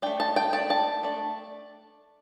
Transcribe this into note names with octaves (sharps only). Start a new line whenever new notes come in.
A3 D4 G5
A5
G5
A3 D4 A5
A5
A3 D4